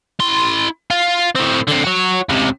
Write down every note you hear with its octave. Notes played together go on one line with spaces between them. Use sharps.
E4 C6
F4
A2 C4
D3 C4
F#4 C#5
C#2 C3